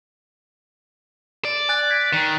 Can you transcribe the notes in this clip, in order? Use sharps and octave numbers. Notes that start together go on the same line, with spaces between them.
D5
G#5 F#6 A6
G#6 B6
D#3